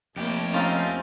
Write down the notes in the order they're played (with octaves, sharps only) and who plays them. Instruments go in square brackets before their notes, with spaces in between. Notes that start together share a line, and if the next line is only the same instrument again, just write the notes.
[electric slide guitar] F2 G4 [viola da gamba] A3 A#3 C#5
[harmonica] F3 C4 D#4 [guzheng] C#4 F4